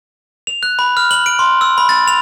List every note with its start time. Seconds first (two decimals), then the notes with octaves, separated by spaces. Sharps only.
0.47 F7
0.63 F#6
0.79 B5
0.97 F6
1.11 F#7
1.26 D7
1.39 C6
1.61 E6
1.78 B5
1.89 A6
2.08 F7